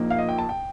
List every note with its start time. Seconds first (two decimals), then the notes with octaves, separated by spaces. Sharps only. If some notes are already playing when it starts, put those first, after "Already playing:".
Already playing: A#1 A#2 F3 A#3 D#4
0.10 F5
0.18 D#5
0.29 G5
0.38 A5
0.49 G5